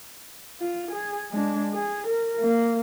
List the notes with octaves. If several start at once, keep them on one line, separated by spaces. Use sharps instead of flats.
F4
G#4
G#3 D4
G#4
A#4
A#3